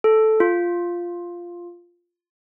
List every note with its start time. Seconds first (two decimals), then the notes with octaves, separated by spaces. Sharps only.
0.04 A4
0.40 F4